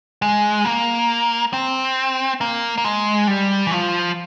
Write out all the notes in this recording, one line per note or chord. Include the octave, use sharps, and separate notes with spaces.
G#3
A#3
C4
A#3
A#3
G#3
G3
E3
F3